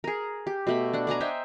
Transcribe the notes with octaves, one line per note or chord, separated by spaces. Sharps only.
G#4 A#4
G4
B2 A3 B5
D4 F#5
D5 F#5 G#5 A#5
C5 D#5 E5 G5